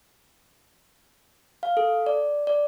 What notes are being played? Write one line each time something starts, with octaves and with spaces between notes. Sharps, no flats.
F5
A4
D5
D5